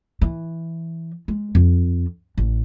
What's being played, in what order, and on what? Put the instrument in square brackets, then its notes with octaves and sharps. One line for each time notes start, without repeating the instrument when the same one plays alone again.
[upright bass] E3
G#3
F2
A1